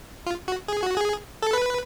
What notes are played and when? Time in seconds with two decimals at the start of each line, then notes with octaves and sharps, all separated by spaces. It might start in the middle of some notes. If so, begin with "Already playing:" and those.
0.26 F4
0.48 F#4
0.68 G#4
0.82 F#4
0.97 G#4
1.42 A4
1.53 B4